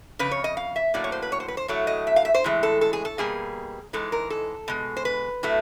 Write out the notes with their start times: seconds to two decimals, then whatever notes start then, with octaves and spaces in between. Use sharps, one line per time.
0.19 F2 C#3 B4
0.31 C#5
0.44 D#5
0.57 F5
0.76 E5
0.94 A2 F#3 A#3 D5
1.04 C#5
1.12 C5
1.22 B4
1.32 C#5
1.40 C5
1.48 B4
1.57 C5
1.68 A2 F#3 A3 C#5
1.87 D#5
2.07 E5
2.16 F5
2.25 E5
2.34 C5
2.44 A2 E3 G#3
2.63 A4
2.81 A4
2.93 G#4
3.05 A4
3.18 B2 G3 A#3 G#4
3.93 G#2 E3 G#3 A4
4.12 A#4
4.30 A4
4.68 B2 G#3
4.97 C5
5.05 B4
5.43 A2 F#3 A3